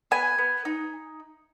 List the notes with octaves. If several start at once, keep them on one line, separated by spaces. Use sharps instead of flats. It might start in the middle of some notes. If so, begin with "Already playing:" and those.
B3 G#5
B3
D#4